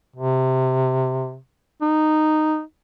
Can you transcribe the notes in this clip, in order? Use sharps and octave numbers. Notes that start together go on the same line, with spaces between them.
C3
D#4